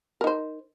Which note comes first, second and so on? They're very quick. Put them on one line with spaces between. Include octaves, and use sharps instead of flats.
A#4 D#4 C5